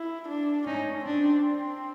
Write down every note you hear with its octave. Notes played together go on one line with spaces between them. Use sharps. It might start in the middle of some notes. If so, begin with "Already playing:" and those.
Already playing: E4
D4
C#4 D#4
C4 D4